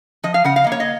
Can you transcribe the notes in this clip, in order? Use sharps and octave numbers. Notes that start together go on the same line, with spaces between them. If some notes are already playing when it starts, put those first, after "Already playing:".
F3 D#5
F5
C#3 F#5
F5
A#3 D#5
C#5
D#5